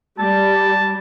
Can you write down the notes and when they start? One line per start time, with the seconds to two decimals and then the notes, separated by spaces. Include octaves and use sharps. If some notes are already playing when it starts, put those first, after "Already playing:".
0.19 G3 A5